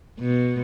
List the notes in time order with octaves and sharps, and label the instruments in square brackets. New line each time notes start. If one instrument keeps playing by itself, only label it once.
[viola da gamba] B2